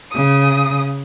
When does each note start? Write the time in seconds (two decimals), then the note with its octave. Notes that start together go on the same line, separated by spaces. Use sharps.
0.12 C#3 D#6